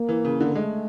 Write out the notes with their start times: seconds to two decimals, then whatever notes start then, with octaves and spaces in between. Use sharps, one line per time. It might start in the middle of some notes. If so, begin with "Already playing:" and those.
Already playing: A#3
0.09 E3
0.25 C#3
0.41 D3
0.55 G#3 A3